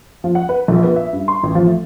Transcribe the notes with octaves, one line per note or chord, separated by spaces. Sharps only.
F3
F#5
B4
A#1
B3
E5
G2
C6
A1
F3
A3